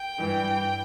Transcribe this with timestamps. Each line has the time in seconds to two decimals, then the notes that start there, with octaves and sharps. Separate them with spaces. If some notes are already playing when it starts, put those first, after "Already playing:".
Already playing: G5
0.17 G2 E3